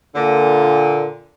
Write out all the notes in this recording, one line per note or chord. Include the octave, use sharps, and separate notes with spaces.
A#2 D3